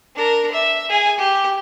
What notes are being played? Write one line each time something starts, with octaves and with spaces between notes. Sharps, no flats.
D4 A#4
E5
G#4 G#5
G4